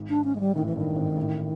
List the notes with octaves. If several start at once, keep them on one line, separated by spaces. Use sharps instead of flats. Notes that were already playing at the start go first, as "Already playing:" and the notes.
Already playing: G#1 G#2
D4
C#4
G#3
G3
A1 A2 D#3
E3
G2 D#3
G#1 G#2
A1 A2